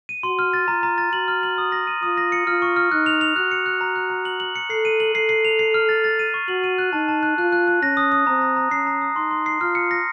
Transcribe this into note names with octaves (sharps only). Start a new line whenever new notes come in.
D#7
F#4 C6
F6
A6
F4 A#5
A#5
A6
F#4 F#7
F6
F#7
D#6
A#6
D#7
F4 D#6
A#6
C#7
F4 F6
C#6
F6
D#4 F#6
F7
F7
F#4 F#6
C#7
F#6
A#5
F#6
A#5
F#7
F#7
C#7
A4 C7
D#7
F#7
A4 C7
C7
F7
C7
F6
A6
A6
D#7
C#6
F#4 F#7
D#7
F#6
D#4 A5
A5
F#6
F4 F#6
F#6
F#6
C#4 A#6
D#6
D#6
C4 A#5
A#5
A#5
C#4 C7
A#5
D#6
D#4 C6
C6
C7
F4 F6
C#7
A#6